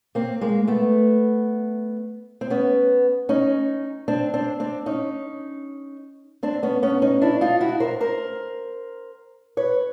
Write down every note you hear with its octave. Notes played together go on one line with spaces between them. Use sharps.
A#3 C4
G#3 A#3
A3 B3
C4
B3 C#4
C#4 D#4
C4 D4
C4 D4
C4 D4
C#4 D#4
C4 D4
B3 C#4
B3 C#4
C#4 D#4
D4 E4
D#4 F4
E4 F#4
A#4 C5
A#4 C5
B4 C#5